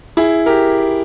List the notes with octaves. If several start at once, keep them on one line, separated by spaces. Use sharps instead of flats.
E4 G#4
G4 A#4